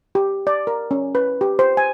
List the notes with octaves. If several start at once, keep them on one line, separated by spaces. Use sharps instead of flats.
G4
D5
A#4
C#4
B4
G4
C5
G#5